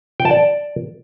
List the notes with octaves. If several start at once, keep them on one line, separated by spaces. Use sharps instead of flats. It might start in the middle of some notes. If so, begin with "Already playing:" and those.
G5
A5
D5